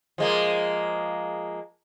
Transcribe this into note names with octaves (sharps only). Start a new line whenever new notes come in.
F3 G#3 A#3